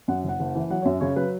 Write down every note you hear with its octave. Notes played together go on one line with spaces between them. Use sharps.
F#2 F#5
F#1
F#5
F#1
E3
F#3 F#5
C#5
F#2 E5
C#3 C#5
F#3 B4